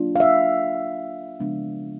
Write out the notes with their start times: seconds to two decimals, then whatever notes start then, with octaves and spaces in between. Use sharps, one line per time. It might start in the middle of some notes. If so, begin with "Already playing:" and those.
Already playing: F#3 A#3 D4 F4
0.16 F5
0.20 E5
1.40 C#3 F3 G#3 B3 D4